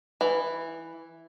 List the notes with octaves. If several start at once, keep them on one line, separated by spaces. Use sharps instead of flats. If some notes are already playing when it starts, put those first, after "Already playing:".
E3